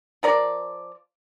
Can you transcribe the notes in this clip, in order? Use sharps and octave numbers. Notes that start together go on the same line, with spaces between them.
F3 A#4 D5